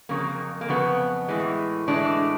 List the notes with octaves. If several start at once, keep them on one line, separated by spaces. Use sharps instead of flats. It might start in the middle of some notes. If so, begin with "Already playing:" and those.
F2 C#3 F#3 A#3
A#3
F2 C#3 F#3 B3
A2 E3 G#3
A2 E3 G#3 D4